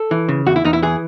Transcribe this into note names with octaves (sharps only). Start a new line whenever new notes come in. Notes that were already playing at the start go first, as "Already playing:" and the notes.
Already playing: A4
E3
C#3
E2 F#4
E4
E2 D#4
E4
E3 G#4